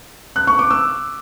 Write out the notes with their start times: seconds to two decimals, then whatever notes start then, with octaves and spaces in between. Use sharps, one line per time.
0.36 F#6
0.47 C#6
0.59 D6
0.71 E6